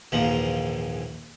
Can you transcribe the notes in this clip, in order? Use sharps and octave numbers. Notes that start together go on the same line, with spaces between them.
A#1 D#2 G#2 E3 F3 A#5